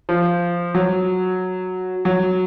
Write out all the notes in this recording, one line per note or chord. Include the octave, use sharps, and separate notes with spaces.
F3
F#3
F#3